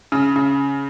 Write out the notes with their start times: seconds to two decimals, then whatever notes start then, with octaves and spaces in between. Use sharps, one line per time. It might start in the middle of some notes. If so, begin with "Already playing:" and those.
0.12 C#3
0.36 C#3